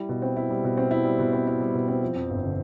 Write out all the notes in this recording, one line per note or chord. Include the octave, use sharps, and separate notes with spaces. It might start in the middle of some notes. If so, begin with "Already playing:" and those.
Already playing: G3 E4
B2
C4
E4
G3
B2
C4
E4
G3
B2
C4
E4
G3
B2
C4
F3
F2
G1
D3